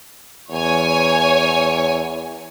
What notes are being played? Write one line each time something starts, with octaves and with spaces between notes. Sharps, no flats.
E2 C#5 G#5